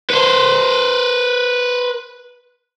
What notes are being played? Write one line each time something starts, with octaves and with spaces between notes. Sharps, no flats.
B4 C5